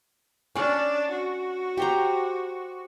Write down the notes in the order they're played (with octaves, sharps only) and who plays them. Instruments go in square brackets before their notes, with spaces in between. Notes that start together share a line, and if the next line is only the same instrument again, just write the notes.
[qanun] C#4 D5 [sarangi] D4
[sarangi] F#4
[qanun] G4 C5 A#5